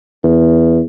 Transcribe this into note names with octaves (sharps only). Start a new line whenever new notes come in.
E2